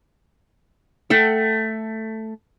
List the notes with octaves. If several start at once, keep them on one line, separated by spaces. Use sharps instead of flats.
A3 A4 F#5 G5